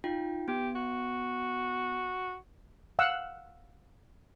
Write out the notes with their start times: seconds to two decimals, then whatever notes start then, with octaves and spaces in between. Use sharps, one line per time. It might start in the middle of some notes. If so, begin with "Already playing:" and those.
0.04 D#4 F4 G5
0.48 B3 G4
0.75 F#4
2.99 F5 F#5 E6